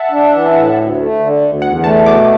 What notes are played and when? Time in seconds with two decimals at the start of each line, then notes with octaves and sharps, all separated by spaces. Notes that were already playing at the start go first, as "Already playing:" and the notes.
Already playing: E5 F#5 A5
0.11 D4
0.32 E3
0.53 A2
0.76 D2
0.97 A3
1.19 D3
1.41 D2
1.62 E2 F#5
1.84 A3 A5
2.06 B2 D6